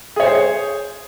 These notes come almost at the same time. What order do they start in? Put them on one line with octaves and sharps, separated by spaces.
G#4 C#5 C5